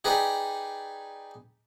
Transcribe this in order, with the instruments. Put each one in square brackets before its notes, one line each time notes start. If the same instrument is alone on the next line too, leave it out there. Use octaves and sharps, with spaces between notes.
[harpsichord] D#4 G4 G#4 B4 D5